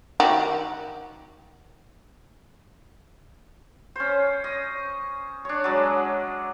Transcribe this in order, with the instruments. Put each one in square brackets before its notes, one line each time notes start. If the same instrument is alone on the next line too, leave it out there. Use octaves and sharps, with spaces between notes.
[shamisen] D#3 F#4 G4
[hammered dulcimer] C#4 C5
D#5
D4 C#5
F#3 G#3